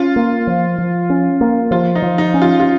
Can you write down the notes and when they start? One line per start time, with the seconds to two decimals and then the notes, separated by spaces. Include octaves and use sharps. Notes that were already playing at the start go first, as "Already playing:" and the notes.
Already playing: C#4 F4
0.16 A#3
0.47 F3
0.78 F3
1.10 C#4
1.41 A#3
1.71 F3 F4
1.95 D#4
2.02 F3
2.18 D#4
2.34 C#4
2.42 F4
2.60 F4